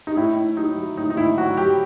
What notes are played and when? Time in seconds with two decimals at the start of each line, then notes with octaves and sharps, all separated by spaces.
0.07 D#4
0.16 A2 E4
0.36 A2
0.56 F#3 D#4
0.77 F#3
0.97 A2 D#4
1.10 D#4
1.17 A2 E4
1.38 F#3 F#4
1.57 F#3 G4